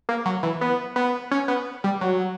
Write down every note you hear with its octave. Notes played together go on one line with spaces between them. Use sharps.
A#3
F#3
E3
B3
B3
C#4
B3
G3
F#3